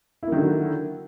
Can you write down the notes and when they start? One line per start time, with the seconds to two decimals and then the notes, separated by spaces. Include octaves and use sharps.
0.23 E4
0.27 A#3
0.32 D#3
0.37 D3
0.42 F#3